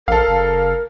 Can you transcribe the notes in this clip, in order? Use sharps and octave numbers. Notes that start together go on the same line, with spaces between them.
A#1 A4 A#4 F5
F#1